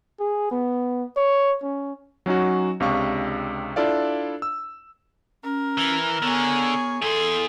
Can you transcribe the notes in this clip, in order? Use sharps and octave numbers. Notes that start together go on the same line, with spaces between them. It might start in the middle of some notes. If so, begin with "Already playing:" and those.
G#4
B3
C#5
C#4
F#3 C#4 D#4 F#4
C#2 C3 D4 F5 C#6
D4 E4 F4 A4 D5 F5
E6
C#4 A#4
E3
D3 B3 G#4 C#5
E2 G#4 A4 C6